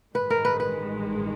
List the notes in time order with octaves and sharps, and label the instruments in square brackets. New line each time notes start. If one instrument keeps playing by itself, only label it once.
[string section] A1 G2 D#3 G#3 [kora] B4
[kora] A#4
B4
B4